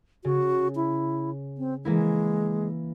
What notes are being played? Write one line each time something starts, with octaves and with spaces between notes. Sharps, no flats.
C#3 F#4
E4
C4
E3 G#3 A#3 E4